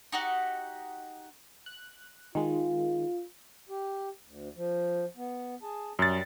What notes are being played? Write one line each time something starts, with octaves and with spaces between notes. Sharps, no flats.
D#4 F#4 G4 F#5
F#6
D#3 G#3 F4
G4
D2
F3
B3
G#4 A5
F#2 G3 A6